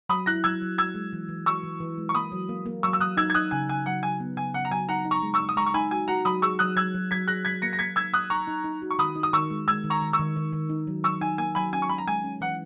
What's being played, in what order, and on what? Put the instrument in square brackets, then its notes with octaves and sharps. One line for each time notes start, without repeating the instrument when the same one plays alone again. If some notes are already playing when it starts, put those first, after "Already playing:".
[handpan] F#3 [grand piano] B5 D#6
[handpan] E4 [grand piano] F#6 A#6
[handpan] F#3 [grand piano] E6 G#6
[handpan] F#3
[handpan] F#4 [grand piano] E6 G#6
[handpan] G#3
E3
E3
[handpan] F#4 [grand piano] C#6 E6
[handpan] E3
E3
G#3
[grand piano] C#6
[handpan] A#3 [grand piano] B5 D#6
[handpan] F#3
A#3
A#3
[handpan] F#3 [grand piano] C#6 E6
[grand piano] E6
[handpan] F#3 [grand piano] D#6 F#6
[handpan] D#4 [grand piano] E6 G#6
[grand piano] G#6
[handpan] D#4 [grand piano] D#6 F#6
[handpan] C#3 [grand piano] G#5
[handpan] C#3 [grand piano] G#5
[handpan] F#3 [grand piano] F#5
[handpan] F#3 [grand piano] G#5
[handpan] B3
[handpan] C#3 [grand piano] G#5
[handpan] C#3 [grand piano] F#5
[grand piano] A#5
[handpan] F#3 [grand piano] G#5
[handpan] D#4 [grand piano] F#5 A#5
[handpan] D#4
[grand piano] A#5 C#6
[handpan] G#3
[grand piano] C#6 E6
[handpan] D#4
[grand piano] D#6
[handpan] G#3 [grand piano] A#5 C#6
[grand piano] C#6
[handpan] D#4 [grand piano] G#5 B5
[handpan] F#4 [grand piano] G#5
[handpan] F#4 [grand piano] F#5 A#5
[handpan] F#3 [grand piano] B5 D#6
[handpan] G#4 [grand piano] C#6 E6
[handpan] F#3 [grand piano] D#6 F#6
[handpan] F#3 [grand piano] E6 G#6
[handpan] F#3
[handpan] F#3 [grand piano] G#6 B6
[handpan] G#4 [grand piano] F#6 A#6
[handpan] F#3 [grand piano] G#6 B6
[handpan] A#3 [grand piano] A#6 C#7
[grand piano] A#6
[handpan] A#3 [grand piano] G#6 B6
[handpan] D#4 [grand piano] E6 G#6
[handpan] A#3 [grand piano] D#6 F#6
[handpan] D#4 [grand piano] A#5 C#6
[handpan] D#4
D#4
F#4
[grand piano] C#6
[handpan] D#3 [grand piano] B5 D#6
[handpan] D#4
[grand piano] D#6
[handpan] D#3 [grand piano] C#6 E6
[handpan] G#3
[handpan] G#3 [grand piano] E6 G#6
[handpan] D#3
[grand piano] A#5 C#6
[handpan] D#3
[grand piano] C#6 E6
[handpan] D#3
D#3
D#3
D#4
F#3
[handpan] F#3 [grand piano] C#6 E6
[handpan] D#4 [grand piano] G#5
[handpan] A#3 [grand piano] G#5
[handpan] F#3 [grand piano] G#5 B5
[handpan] C#4 [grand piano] G#5
[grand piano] C#6
[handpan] C#4 [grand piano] B5
[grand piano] A#5
[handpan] G#3 [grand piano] G#5
[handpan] C#4
[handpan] E3 [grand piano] F#5